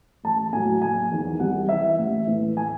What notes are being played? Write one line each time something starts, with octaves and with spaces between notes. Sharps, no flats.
A1 A5
A2 F#3 G#5
F#1 G#5
E2 D#3
C2 F#5
C3 E3 E5
A1
A2 E3
G#5